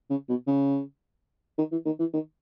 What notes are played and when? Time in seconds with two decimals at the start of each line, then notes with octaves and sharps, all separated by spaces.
0.10 C#3
0.29 B2
0.47 C#3
1.58 D#3
1.72 E3
1.86 D#3
2.00 E3
2.13 D#3